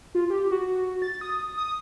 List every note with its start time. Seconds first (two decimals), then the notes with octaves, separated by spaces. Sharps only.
0.15 F4
0.30 G4
0.51 F#4
1.02 A6
1.21 D#6
1.57 D#6